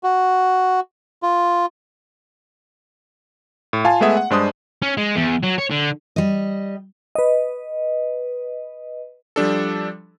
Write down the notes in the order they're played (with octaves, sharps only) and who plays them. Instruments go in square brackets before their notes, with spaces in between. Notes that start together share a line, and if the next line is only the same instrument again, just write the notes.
[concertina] F#4
F4
[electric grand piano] A2
F4 F5 G#5 A5
G#3 A3 B3 G#4 E5 F#5
F#5
G2 G#3 D4 C5 C6 D#6
[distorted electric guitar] C#4
G#3
E2
F#3
C#5
D3
[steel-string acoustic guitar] G3 D#5
[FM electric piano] B4 D#5
[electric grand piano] F3 G3 D4 A4